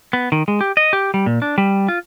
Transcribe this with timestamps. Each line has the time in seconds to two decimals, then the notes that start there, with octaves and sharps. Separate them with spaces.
0.13 B3
0.32 D#3
0.48 G#3
0.61 G4
0.77 D#5
0.93 G4
1.14 G3
1.26 A#2
1.42 D4
1.58 G3
1.88 F4